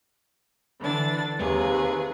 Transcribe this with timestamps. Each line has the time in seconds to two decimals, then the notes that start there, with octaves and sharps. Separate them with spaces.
0.80 D3 E3 D4 A6
1.38 D#2 C3 G#4 B4